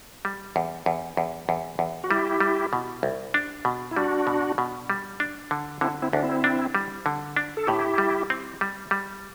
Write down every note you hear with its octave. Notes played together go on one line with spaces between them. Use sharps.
G3
E2
E2
E2
E2
E2
F#4
G3 E4 G4
G3
B2
C2
D4
B2
E4
G3 D4 F#4
B2
B2
G3
D4
D3
D3 C4 E4
C4 E4
D2 D4
C4 E4
D4
G3
D3
D4
A4
A2 E4 G4
G3
C4
G3
G3